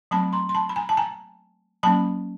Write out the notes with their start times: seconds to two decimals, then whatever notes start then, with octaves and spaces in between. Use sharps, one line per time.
0.11 F#3 A3 C4 A5 B5
0.33 A#5 C6
0.49 C6
0.55 A5 B5
0.69 B5
0.76 G#5 A#5
0.89 A5
0.97 G#5 A#5
1.83 F#3 A#3 C#4 A5 B5